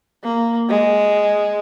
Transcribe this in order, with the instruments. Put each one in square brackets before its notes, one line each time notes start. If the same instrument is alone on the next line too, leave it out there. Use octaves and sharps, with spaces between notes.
[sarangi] A#3
G#3